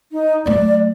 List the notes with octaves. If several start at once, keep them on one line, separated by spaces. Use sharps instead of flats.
D#4
F#3 A3 D5